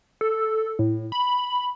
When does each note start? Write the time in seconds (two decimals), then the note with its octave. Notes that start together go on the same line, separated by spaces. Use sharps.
0.21 A4
0.79 A2
1.12 B5